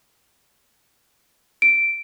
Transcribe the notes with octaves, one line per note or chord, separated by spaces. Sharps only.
D7